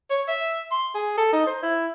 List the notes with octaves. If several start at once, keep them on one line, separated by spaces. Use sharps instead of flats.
C#5
E5
C6
G#4
A4
D#4
C5
E4